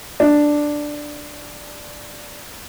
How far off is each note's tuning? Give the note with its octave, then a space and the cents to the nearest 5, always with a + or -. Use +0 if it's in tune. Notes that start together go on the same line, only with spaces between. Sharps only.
D4 +5